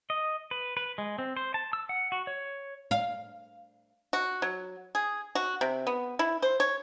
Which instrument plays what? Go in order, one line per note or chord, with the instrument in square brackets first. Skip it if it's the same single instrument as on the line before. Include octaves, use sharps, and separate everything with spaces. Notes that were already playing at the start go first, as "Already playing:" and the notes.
[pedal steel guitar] D#5
B4
B4
G#3
C4
C5
A5
E6
F#5
F#4
C#5
[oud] F5
[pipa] F#4
F#3
G#4
F#4
C3
B3
E4
C5
C#5